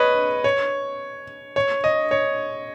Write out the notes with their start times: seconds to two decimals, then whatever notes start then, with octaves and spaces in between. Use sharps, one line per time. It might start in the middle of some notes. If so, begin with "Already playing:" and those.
Already playing: B4 C#5 D#5
0.44 C#5
1.56 C#5
1.84 D#5
2.11 C#5